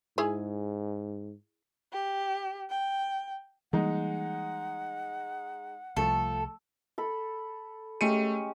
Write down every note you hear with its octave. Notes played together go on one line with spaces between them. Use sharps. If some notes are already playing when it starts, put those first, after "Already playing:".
G#2 E4 G#4 G#5
G4
G5
E3 G3 G#3 A#3 D#4 F#5
C2 F3 A3 A4
A4 B5
G#3 A3 C#4 G4 C#7 D#7